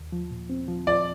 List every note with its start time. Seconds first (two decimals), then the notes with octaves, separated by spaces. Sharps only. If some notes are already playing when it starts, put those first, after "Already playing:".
Already playing: D#2
0.12 F3
0.31 A#2
0.50 C4
0.68 F3
0.87 F3 D5